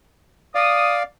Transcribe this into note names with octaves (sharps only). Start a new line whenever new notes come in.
D5 F5 D#6